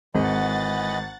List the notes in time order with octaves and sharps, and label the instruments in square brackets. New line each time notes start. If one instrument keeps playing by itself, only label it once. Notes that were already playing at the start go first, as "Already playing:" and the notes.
[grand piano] G#1 [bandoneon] E3 D#5 B5 [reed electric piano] G#3 [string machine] F#5 A6